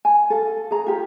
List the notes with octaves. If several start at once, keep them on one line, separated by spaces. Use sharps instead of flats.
G#5
A4 F5
G#4 A#5
F4 G4